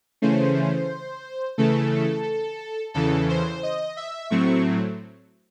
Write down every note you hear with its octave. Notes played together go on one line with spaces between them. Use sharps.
C#3 E3 A3 C#4 C5
C#3 E3 A3 A4
E2 C#3 E3 A4
C5
D#5
E5
A2 F#3 A3 C4 C#6